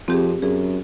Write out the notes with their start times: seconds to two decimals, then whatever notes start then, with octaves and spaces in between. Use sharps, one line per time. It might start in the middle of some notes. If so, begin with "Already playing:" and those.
0.08 F2 C4 G4 G#4
0.42 F#2 G#4